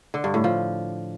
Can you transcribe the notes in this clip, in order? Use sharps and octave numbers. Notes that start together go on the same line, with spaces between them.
D3
G2
A2
F3